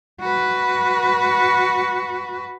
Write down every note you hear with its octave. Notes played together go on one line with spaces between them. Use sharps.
F#4 B4